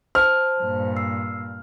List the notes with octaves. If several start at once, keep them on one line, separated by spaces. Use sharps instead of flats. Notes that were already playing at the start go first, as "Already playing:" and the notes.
C5 A5 F6
G2 A#2
E6 C7